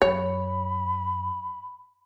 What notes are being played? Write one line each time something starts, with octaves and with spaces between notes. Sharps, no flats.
F#2 C#5 B5